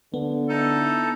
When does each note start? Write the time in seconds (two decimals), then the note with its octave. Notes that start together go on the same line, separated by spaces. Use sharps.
0.14 D3 B3
0.49 D#4 E4 A4